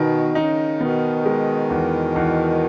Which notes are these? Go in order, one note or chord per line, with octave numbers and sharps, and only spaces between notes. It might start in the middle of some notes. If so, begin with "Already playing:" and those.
Already playing: B2 D#3
C#3 D#4
B2 D#3 B3
G#3
E2
E2